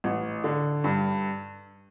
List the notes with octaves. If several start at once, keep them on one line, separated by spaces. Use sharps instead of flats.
A1
D3
G2